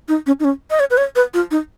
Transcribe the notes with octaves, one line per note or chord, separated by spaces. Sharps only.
D#4
C#4
D#4
C#4
D#5
C#5
B4
C#5
B4
F4
D#4